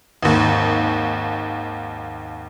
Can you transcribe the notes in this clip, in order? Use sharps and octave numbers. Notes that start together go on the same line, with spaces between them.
G#1 D#2